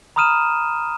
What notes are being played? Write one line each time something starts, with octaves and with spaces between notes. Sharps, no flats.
A#5 B5 D#6 F6 D#7 E7